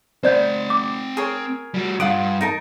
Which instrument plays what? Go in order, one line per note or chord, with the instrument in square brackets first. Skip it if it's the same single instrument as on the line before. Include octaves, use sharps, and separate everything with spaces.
[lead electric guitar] C4 F#5 [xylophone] C5 D5 G6
[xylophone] D6
[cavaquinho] G#4 A#4 C#5
[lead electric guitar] G3 F#4
[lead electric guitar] G2 [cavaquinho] F4 F#5 D#6 [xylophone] D7
[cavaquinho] D#4 A#4 A5